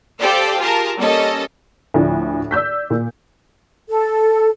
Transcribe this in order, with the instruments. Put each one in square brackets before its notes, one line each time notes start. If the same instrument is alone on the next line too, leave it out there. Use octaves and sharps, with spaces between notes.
[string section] G4 A4 C5 D5 F5 G5
F4 G4 G#4 A#4 A5
G3 A#3 C#4 A4 D#5
[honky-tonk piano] D2 A2 F3 D4
D5 E6 G6 B6
A#2
[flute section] A4